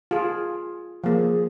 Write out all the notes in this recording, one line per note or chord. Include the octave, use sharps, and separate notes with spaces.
F4 G#4
F3 A#3 G#4